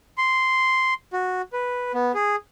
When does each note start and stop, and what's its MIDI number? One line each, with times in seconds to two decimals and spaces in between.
0.18 0.94 84
1.13 1.42 66
1.53 1.92 71
1.94 2.12 59
2.14 2.36 68